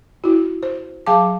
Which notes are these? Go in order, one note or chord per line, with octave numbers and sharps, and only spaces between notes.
E4 F#4
C5
F#3 G#4 F5 G5 A5 D6